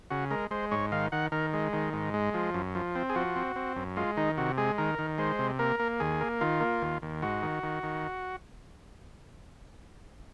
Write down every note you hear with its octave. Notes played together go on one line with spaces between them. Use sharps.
C#3 F#4
G#3 A#4
G#3 C5
G#2 C#5
D#3 F5
D#3 F#5
D#3 A#4
G#3
D#3
G#2
G#3
F3
F#2
F3
C4
G#4
F3 F#4
C4
C4
F#2
G#3 F4
D#3 D#4
C3 F#4
G#3 G#4
D#3 A#4
D#3
G#3 C5
C3
A#3 A#4
A#3
D#2 G#4
A#3
D#3 F4
A#3
D#2
D#2
G#2 F#4
D#3
D#3
D#3